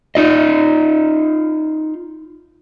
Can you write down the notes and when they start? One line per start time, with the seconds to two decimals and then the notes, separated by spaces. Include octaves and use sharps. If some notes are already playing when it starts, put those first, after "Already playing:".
0.15 D#4 F4 D#5